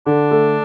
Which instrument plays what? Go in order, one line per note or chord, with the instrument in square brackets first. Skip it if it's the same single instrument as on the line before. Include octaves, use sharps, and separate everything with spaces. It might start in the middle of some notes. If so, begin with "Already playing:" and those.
[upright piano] D3 [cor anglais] D4
[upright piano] A3